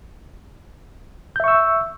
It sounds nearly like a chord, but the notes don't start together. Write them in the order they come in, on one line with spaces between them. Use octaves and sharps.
G6 E5 C#6 E6